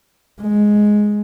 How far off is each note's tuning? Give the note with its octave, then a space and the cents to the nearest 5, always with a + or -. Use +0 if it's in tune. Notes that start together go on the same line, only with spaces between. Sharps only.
G#3 +5